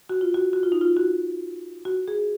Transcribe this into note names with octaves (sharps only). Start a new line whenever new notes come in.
F#4
F4
F#4
F#4
F4
D#4
F4
F#4
F#4
G#4